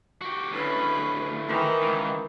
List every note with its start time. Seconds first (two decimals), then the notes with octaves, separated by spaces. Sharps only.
0.21 F#4 G4
0.51 D2 A2 C#4 B4
1.48 D#3 E3
1.82 C#2